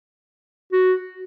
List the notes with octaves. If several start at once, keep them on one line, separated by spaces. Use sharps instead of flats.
F#4